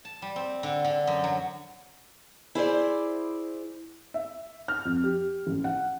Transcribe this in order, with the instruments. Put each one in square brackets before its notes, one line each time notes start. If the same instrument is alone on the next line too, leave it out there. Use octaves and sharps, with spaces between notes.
[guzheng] A5
G3
C4
D3
D3
F#2
F#3
[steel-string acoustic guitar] E4 G#4 C5 D5
[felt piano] E5
F6
F2
G4
A1
F#5